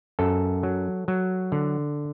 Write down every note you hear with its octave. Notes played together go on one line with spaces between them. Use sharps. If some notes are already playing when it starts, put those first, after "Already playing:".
F#2 A4
F#3
F#3
D3